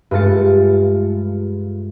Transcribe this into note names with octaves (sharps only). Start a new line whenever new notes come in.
G2 G#3 A3 F4 A6 C#7